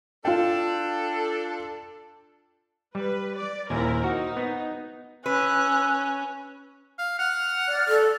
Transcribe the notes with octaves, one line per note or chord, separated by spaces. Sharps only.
D4 F4 A4 G5
G3 B4
D5
D#2 A#2 C4 E4 A#4 G#5
D#4 F#4
B3
C#4 B4 E6 F#6
F5
F#5 F6
D5
A4